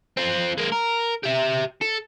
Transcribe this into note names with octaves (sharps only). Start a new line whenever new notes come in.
C4 F4
G#3 A#3
A#4
G4 E5
A4